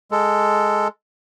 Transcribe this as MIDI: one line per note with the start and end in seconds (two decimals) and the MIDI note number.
0.12 0.88 56
0.12 0.88 69